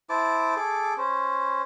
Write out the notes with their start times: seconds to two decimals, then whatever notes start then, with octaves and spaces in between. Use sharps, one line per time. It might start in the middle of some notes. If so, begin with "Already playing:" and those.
0.09 E4 C5 A5 D6
0.56 G#4 A4 D6
0.98 C#4 C5